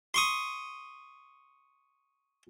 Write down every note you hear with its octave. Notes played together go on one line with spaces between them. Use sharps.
C6 C#6 D#6